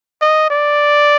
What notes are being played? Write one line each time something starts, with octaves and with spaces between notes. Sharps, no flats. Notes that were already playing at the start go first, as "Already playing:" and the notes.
D#5
D5